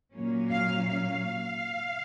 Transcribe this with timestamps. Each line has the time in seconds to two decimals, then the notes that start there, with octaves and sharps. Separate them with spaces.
0.13 A#2 F#3 A#3 C#4
0.50 F5
0.88 F5